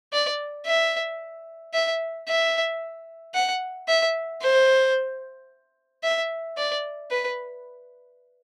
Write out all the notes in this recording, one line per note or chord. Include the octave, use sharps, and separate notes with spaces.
D5
E5
E5
E5
F#5
E5
C5
E5
D5
B4